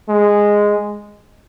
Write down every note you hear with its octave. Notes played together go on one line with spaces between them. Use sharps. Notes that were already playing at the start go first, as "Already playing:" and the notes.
G#3